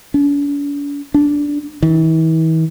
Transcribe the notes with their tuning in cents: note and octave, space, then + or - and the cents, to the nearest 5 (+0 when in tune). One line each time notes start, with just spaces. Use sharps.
D4 -45
D4 -10
E3 -45